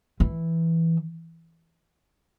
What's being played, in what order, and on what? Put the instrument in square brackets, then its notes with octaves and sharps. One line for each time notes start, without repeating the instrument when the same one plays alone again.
[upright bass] E3